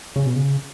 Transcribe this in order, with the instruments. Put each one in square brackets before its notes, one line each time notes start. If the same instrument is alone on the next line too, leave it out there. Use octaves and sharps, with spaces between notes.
[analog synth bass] C#3
B2
C#3